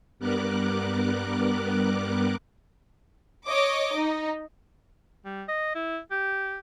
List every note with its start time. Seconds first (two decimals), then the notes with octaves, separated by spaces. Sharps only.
0.19 G2 G3 B3 A#4 D6 F#6
3.46 C#5 D#5 D6
3.96 D#4
5.25 G3
5.48 D#5
5.75 E4
6.11 G4